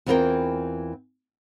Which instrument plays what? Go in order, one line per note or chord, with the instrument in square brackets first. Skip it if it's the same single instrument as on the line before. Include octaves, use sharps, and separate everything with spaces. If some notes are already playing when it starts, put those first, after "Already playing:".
[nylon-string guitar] E2 E3 C4 F4 A#4 G5